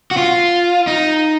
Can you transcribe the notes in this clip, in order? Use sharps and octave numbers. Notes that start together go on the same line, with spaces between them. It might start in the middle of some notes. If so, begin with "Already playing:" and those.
F#4
F4
D#4